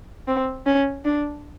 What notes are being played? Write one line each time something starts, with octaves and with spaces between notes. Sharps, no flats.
C4
C#4
D4